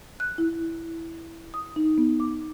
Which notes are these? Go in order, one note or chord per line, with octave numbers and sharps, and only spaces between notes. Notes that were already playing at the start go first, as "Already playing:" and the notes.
F#6
E4
D#6
D#4
B3
D6